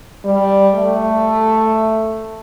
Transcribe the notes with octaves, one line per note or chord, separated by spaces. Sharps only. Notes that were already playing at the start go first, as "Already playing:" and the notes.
G3
A3